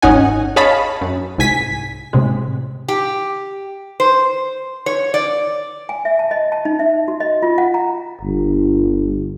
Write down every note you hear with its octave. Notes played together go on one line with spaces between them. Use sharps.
G#1 D#2 C#4 D#4 F#5 G#5
G#4 C#5 D#5 F5 A5 B5
F#2
C2 G#2 G#5 B6
A2 C3 G#3
G4
C5
C#5
D5
G#5
E5
A5
D#5
A5
D#4
E5
F#4
D#5
F4
F#5
A#5
G1